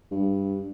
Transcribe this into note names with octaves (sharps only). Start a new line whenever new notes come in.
G2